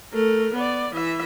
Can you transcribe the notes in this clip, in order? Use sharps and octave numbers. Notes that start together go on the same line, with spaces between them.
A3 A#4
B3 D5
E3 E5